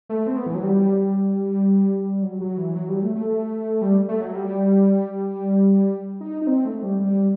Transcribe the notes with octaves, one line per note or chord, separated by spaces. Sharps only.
A3
C4
B3
E3
F#3
G3
F#3
F#3
E3
F#3
G3
A3
A3
G3
A3
F#3
G3
D#4
D#4
C4
A3
G3
G3